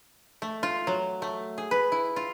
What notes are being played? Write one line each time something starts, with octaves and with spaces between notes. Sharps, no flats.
A3
F4
F#3
A3
G#4
B4
E4
F4